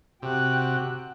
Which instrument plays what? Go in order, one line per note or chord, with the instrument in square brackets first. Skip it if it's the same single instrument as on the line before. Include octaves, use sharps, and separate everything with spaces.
[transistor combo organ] C3 [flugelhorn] F#4 [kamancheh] G5 F#6